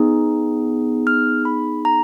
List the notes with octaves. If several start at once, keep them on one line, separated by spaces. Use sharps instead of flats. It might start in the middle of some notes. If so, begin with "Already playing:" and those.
Already playing: B3 D#4 G#4
F6
B5
A#5